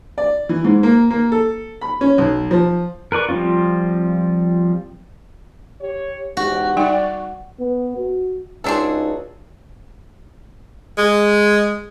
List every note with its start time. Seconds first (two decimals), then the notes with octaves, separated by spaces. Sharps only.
0.18 D5
0.49 E3
0.64 G#2
0.83 A#3
1.10 A#3
1.32 A4
1.81 B5
2.01 C#4
2.18 B1
2.51 F3
3.12 A#4 B4 D5 C#6
3.29 F3 G3 C4 C#4 F4
5.81 G4 C#5
6.37 E2 G#2 F#4 G4
6.77 G3 D#4 D5 G5
7.60 B3
7.97 F#4
8.64 C#2 C4 D4 D#4 F#4 G#4 A4
10.98 G#3